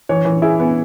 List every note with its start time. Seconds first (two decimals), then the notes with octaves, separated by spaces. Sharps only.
0.09 E3 C#5
0.25 E3
0.42 E4 G#4
0.60 B3